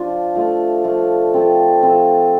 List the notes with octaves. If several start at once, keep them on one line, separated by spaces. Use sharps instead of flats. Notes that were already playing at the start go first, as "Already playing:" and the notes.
Already playing: F3 D4 F4
F3 A3 F4
F3 A3 F4
F3 C4 A4
F3 C4 A4